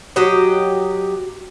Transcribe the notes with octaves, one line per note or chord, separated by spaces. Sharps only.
F#3 G4 D#5